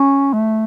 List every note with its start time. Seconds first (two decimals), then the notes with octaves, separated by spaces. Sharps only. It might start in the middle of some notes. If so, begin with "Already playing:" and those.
Already playing: C#4
0.34 A3